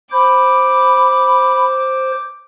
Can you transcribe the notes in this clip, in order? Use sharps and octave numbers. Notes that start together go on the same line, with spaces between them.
C5 B5 D6